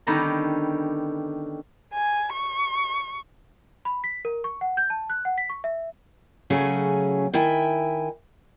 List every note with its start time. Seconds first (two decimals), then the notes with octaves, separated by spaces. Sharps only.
0.07 D3 D#3 G3 B3 C#4 A#5
1.94 G#5
2.33 C#6
3.85 B5
4.04 B6
4.25 A#4
4.44 C#6
4.61 F#5
4.77 G6
4.90 A5
5.10 F#6
5.25 F#5
5.38 B6
5.50 C#6
5.64 E5
6.50 C#3 F#3 A3 C#4 G#4
7.34 D#3 E4 E5 G5 G#5